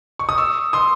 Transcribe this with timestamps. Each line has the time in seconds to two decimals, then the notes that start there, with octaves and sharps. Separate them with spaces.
0.19 C#6
0.29 D#6
0.38 C#6 E6
0.73 C6 D#6